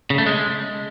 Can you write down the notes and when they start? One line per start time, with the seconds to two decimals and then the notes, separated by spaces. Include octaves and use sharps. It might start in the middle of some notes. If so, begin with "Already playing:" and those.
0.10 C#3
0.18 A3
0.26 G#3